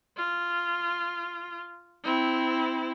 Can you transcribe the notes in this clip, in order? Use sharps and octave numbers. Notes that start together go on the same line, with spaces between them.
F4
C4 E4